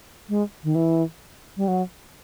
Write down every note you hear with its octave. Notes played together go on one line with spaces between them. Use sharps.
G#3
D#3
E3
G3
F#3